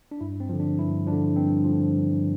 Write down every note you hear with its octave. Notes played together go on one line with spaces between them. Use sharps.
D4
G2 E4
C4
D3 F3
D4
G2 E4
F3 D4
D3
G2 C4
D3 F3
G2